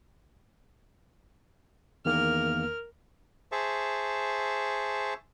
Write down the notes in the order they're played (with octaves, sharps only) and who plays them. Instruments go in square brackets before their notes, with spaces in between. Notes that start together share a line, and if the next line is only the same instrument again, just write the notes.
[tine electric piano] E2 D#3 A#3 [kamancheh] A#4 F6
[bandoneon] G#4 C5 E5 A5 C#6